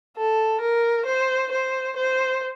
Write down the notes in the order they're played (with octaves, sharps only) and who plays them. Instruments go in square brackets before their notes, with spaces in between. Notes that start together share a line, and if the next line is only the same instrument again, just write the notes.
[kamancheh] A4
A#4
C5
C5
C5